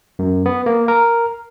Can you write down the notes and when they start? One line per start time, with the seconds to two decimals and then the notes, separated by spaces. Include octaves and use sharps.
0.19 F#2
0.46 B3
0.66 A#3
0.88 A#4